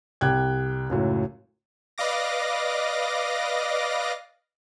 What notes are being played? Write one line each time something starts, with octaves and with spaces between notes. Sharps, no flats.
C2 G4 G5 F#6 G#6
C#2 F#2 A2
B4 D5 D#5 F5 D6 A#6